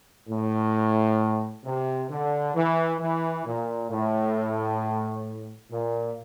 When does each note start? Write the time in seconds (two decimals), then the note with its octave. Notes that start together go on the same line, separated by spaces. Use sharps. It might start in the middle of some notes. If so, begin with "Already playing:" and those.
0.28 A2
1.64 C3
2.10 D3
2.54 E3
3.00 E3
3.45 A#2
3.90 A2
5.71 A#2